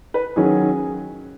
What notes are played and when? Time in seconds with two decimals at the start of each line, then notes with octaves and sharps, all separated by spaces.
0.14 B4
0.36 D#3 F#3 C#4 G#4